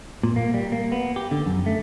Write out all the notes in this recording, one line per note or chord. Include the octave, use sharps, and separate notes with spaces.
A#2
A#3
G3
A#3
B3
G4
D3
F#2
A3